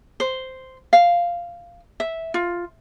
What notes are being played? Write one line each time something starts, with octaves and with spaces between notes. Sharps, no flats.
C5
F5
E5
F4